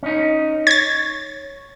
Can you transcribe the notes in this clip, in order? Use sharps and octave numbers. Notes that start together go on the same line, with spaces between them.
C#4 D#4
C#5 G#6 A6